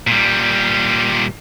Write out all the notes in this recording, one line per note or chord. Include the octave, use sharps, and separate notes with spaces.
A#2 G3